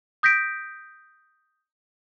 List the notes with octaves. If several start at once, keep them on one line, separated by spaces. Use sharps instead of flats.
D#6 G6 A#6 B6 D7